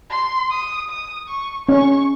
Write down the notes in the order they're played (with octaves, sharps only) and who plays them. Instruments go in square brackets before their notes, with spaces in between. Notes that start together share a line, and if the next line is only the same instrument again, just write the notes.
[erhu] C6
D#6
D#6
C#6
[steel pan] C#4 [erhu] C#6